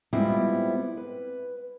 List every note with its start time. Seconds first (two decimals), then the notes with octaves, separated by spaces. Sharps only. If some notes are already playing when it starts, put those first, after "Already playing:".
0.13 G3 G#3 B3 C4 E4 F4
0.97 B4